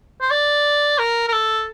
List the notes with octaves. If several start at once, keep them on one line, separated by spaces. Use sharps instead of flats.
C5
D5
A#4
A#4
A4